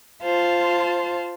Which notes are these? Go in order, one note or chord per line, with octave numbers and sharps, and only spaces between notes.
F4 C5 F5 A5